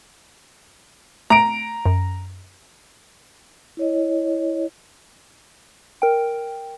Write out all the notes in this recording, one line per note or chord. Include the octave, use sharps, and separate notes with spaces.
A3 A#5 D7
F#2
E4 C#5 D#5
A#4 G5